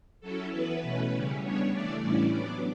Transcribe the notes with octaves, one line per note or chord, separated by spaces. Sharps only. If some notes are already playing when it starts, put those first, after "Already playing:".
F#3 C#4 E4 A4
E3 B3 E4 B4
B2 A3 C#4
C#3 G3 C#4 E4
C#3 G3 B3 D4 C#5
E3 A3 D4 D5
A2 E3 G3 C#4 E4 D5
F#3 B3 D4 D5